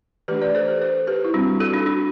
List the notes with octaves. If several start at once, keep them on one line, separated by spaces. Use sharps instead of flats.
E3 A3 D4 G4 B4
B4 D5
A4 C5
G4 B4
A4 C5
G4 B4
E4
G3 C4 D4 F#4
F#4 A4
D4 F#4
D4 F#4